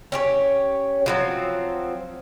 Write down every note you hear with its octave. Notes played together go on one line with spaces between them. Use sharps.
C#4 G4 C#5
F3 F#3 C4